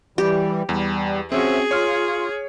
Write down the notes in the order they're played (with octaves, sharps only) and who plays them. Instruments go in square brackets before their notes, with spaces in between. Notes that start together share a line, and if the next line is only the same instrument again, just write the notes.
[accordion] E3 G3 [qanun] G4
[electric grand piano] E2 [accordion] G3
[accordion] F3 E5 [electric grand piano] C4 C#4 F#4 [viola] G#4
[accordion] F4 [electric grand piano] C#5 F6